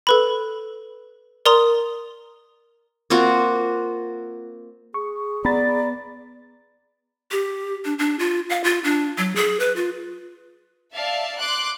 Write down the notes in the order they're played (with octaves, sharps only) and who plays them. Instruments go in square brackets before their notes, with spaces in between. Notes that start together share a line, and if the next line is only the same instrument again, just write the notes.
[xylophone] A4 B4 B5
A#4 D5 A#5 C6 D#6 F7
[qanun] A#3 C4 F4 F#4
[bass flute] G#4 [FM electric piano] C#6
[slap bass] B3 [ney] D5 [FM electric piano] A#5 B5 A6
[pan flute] G4
D4
D4
F4
F5
F4
D4
F#3
G#4
B4
F4
[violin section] D5 E5 F5 A5
C6 D6 F#6